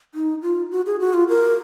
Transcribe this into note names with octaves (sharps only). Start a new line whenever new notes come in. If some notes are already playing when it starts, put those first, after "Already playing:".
D#4
F4
F#4
G#4
F#4
F4
A#4